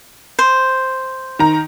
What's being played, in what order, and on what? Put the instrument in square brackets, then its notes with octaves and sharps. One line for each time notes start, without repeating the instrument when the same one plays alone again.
[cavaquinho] C5
[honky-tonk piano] D#3 A#5